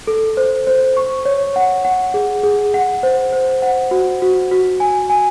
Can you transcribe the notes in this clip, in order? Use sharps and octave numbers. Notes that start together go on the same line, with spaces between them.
A4
C5
C5
C#6
C#5
F#5
F#5
G#4
G#4
F#5
C5
C5
F#5
F#4
F#4
F#4
G#5
G#5